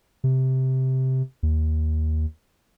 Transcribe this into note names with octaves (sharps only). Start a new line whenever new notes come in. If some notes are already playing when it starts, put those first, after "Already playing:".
C3
D#2